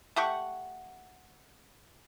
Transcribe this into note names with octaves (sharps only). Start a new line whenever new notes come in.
A3 G4 F#5 C#6